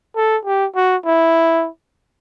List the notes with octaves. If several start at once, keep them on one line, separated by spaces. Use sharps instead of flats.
A4
G4
F#4
E4